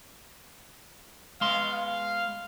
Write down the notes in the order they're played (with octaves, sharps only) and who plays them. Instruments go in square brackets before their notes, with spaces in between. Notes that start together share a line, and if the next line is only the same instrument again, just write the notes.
[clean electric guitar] G#3 B3 C6 [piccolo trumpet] F5
[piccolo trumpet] F5